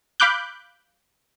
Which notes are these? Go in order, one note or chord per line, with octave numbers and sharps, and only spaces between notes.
F5 B5 D6 F#6 G6